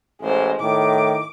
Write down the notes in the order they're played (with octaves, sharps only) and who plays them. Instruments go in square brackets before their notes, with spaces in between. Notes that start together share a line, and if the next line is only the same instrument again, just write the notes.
[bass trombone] A1 [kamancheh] G#3 C5
[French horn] A2 [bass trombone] D#3 [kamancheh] D6